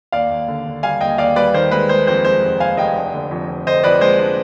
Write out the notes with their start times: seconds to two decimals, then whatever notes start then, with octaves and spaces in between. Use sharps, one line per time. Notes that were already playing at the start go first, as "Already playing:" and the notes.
0.12 D#2 D5 F5
0.30 D#2
0.48 D3
0.66 D3
0.83 G3 F5 G#5
1.01 D#2 D#5 G5
1.18 D#2 D5 F5
1.36 G3 B4 D5
1.54 D#3 C5
1.71 G#3 B4
1.89 G#3 C5
2.07 F2 C5
2.25 G#3 C5
2.43 F1
2.60 F1 F5 G#5
2.77 F1 D#5 G5
2.95 D4
3.14 D3
3.31 F2
3.48 F2
3.67 D3 C5 D#5
3.84 F2 B4 D5
4.01 G#3 C5
4.19 D4